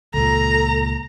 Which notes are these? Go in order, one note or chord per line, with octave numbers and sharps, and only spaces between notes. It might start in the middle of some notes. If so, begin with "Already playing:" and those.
C#2 A#2 A4 A#5